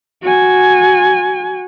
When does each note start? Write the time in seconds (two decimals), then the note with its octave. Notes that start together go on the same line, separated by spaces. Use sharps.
0.23 F#4 G#5